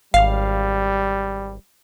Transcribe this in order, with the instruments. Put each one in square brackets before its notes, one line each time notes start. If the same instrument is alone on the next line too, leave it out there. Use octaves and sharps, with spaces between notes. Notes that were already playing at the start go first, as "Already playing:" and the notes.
[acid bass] G#1 [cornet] G3 [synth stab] F5